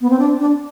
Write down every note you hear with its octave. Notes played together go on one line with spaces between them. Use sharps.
B3
C4
D4
D4